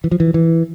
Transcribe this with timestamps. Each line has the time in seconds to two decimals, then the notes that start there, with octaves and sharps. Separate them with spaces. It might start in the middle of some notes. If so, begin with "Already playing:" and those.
0.04 E3
0.11 F3
0.20 E3
0.34 E3